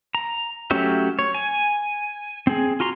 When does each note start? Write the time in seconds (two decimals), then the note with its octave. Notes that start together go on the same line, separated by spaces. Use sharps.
0.15 A#5
0.71 F#3 A3 C#4 G4 E5
1.19 C#5
1.34 G#5
2.47 C4 G#4
2.80 F4 F#4 A#5 C6